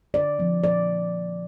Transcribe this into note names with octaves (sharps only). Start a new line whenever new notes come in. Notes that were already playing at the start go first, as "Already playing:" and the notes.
D3 D5
F3 C4
A#2 D5